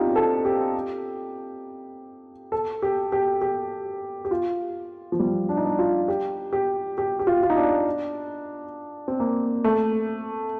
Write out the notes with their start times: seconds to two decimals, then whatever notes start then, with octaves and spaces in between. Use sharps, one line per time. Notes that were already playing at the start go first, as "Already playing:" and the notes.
Already playing: C4 D4 D#4 F4 G4
0.16 A4
0.45 G4
2.52 A4
2.82 G4
3.12 G4
3.42 G4
4.25 G4
4.31 F4
5.12 F3
5.19 G3
5.49 D4
5.57 D#4
5.65 D4
5.79 F4
6.08 G4
6.53 G4
6.98 G4
7.19 G4
7.27 F4
7.43 F4
7.50 D#4
7.57 D4
9.08 C4
9.20 A#3
9.64 A3